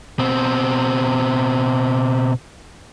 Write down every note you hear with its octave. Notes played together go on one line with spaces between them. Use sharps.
B2 C4